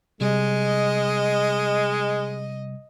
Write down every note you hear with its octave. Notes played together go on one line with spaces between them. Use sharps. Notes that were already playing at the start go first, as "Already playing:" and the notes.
C3 G3 G#3 D#5